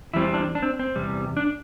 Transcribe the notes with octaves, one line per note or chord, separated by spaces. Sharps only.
E2 E3 G3 C4 E4
D4
D4
C4
C4
E2 C3 G3
D4